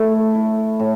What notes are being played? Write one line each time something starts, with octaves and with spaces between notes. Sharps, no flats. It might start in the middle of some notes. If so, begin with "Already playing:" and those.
Already playing: A3 E4
E4
A2